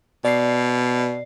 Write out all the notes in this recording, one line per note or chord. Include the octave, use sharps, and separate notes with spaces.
B2 D5 C7